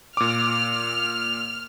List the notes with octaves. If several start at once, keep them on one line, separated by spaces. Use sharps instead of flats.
A#2 D6 F6